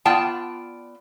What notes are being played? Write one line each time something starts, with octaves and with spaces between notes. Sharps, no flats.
B3 F4 D5 G5 A5